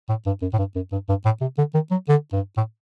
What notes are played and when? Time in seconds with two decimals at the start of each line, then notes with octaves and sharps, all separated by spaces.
0.09 A2
0.27 G2
0.42 F#2
0.53 A2
0.58 G2
0.76 F#2
0.92 G2
1.09 G2
1.25 A2
1.41 C3
1.58 D3
1.74 D#3
1.91 F#3
2.08 D3
2.33 G2
2.57 A2